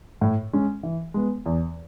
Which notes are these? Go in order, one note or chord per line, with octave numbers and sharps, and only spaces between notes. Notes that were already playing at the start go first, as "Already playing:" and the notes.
A2
G#3 C#4
E3
G#3 B3
E2